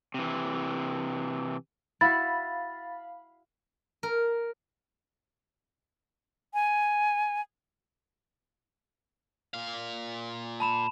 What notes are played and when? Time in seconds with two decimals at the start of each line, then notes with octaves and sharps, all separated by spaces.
0.14 C3 E3
2.01 E4 F#4 F5 B5 A6
4.03 A#4
6.54 G#5
9.54 A#2 F5
10.60 A5 B5 E7